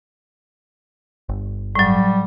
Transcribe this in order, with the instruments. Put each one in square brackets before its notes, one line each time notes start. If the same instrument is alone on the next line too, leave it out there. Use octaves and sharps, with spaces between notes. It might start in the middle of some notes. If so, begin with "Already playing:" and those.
[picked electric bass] G1
[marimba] A2 F#3 [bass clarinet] G3